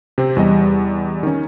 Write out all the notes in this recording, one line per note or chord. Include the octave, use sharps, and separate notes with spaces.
C3 C4
E2 G3 D#5
D#3 C#4